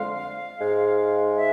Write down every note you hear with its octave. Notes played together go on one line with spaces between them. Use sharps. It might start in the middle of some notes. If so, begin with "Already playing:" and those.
Already playing: F2 D3 G#3 F5
G#2 G#3
E5